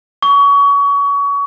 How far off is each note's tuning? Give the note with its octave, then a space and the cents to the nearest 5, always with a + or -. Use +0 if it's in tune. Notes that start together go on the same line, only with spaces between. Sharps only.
C#6 +30